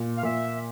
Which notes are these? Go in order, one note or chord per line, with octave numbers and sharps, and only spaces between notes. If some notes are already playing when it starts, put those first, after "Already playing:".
Already playing: A#2
F5
A#2 E5